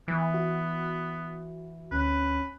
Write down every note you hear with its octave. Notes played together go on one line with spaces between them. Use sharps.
E3 B3
F#4
D2 C#4 B4